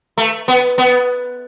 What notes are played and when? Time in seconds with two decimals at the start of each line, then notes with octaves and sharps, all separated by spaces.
0.17 A3
0.48 B3
0.78 B3